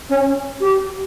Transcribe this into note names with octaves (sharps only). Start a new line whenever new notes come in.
C#4
G4